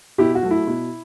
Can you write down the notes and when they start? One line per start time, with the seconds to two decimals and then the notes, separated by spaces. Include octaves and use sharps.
0.18 B2 E4 G4
0.35 F#4
0.42 F#3 A3
0.51 E4
0.67 B2